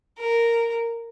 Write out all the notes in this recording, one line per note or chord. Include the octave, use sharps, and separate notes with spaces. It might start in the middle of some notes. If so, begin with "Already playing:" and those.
A#4